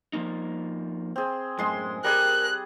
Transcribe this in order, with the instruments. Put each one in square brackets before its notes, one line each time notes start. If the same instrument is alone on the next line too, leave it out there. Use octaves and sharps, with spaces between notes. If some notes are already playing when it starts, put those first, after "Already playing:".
[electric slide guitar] F3 A#3 D#4
[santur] C4 G#4
[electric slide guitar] F#2 A2 [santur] G#3 C6
[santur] G3 G#4 [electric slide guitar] A#4 [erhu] F#6